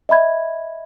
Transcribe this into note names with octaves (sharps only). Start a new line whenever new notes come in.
D#5 E5 B5 G#6